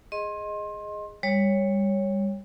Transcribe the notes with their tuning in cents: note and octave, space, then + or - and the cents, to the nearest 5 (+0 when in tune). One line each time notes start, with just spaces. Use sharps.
G#4 +0 D#5 +0 C6 +25
G3 +25 C#5 +0